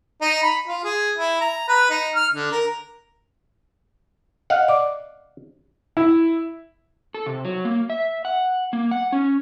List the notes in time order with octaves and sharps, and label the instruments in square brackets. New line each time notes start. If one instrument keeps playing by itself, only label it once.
[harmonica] D#4
B5
F4
G#4
E4
A#5
B4
D#4
F6
D3
A#4
[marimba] D#5 [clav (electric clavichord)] F5 F#5
[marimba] D5 D6
[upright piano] E4
[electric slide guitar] A4
C3
F#3
A#3
E5
F#5
A#3
F#5
C#4